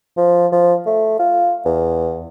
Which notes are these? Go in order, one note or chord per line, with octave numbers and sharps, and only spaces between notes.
F3
F3
A3
F4
E2